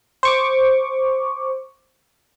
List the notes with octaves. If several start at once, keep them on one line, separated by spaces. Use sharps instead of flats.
C5 C#6 D6